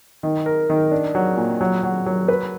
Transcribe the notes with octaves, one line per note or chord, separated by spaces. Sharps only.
D#3
A#4
D#3
D4
F#3
A#2
F#3
F#3
F#3
B4